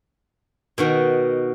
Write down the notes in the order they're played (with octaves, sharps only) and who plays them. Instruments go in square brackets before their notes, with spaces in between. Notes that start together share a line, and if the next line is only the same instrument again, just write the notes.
[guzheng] B2 D#3 F#4